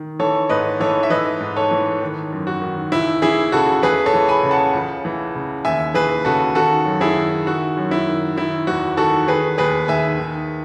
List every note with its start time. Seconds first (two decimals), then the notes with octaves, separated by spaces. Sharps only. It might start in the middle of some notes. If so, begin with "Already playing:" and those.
Already playing: D#3
0.19 E3 A4 C#5
0.49 G#2 B4 D#5
0.80 E3 A4 C#5
1.03 E5
1.10 E3 B4 D#5
1.40 G#2
1.56 A4 C#5
1.71 E3
2.01 D#3
2.32 F#2
2.47 F#4
2.62 D#3
2.92 C#2 E4
3.22 E3 E4 G#4
3.52 C#3 F#4 A4
3.83 E2 G#4 B4
4.06 A4 C#5
4.13 E3
4.28 G#5 B5
4.43 C#3
4.51 F#5 A5
4.74 C#2
5.05 E3
5.35 C#3
5.65 D#2 E5 G#5
5.94 E3 G#4 B4
6.25 C#3 F#4 A4
6.55 D#3 F#4 A4
6.86 F#2
7.01 E4 G#4
7.16 D#3
7.46 D#3 F#4
7.77 F#2
7.91 E4
8.07 D#3
8.37 D#3 E4
8.67 E2 F#4
8.97 D#3 F#4 A4
9.27 D#3 G#4 B4
9.58 D#2 G#4 B4
9.88 D#3 E5 G#5
10.18 D#3